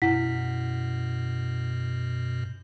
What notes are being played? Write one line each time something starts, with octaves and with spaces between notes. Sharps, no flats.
F#2 B2 E4 F#5 B6